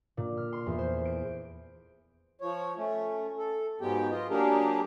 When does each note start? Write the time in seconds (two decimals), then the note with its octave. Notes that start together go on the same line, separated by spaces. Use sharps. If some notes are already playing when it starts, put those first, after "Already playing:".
0.17 A#2
0.37 F6
0.53 C6
0.66 E2
0.79 C5
1.05 D7
2.41 F3 C#5
2.77 A3 C#4
3.38 A4
3.81 G#2 F#3 G#3 B3 G4 G5
4.10 F4 D#5
4.30 F#3 A#3 D4 G4 G#4 A#4